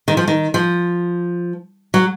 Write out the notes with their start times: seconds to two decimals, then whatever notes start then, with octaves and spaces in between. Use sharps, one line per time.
0.08 D#3
0.17 F3
0.28 D#3
0.54 F3
1.94 F#3